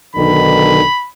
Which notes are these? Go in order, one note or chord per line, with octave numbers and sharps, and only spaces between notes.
B1 D3 D#3 B5